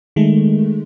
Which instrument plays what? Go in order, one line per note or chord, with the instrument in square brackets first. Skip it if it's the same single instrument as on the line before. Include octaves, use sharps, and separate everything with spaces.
[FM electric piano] D#3 G#3 A3